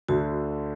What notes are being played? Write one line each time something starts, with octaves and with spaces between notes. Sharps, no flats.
D2 D3 F#4